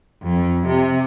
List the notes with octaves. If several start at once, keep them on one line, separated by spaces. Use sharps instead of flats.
F2
C3